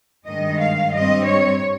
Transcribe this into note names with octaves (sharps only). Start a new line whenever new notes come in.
G2 D#3 G#3 D#5
F5
G2 G3 C4 D#5
C#5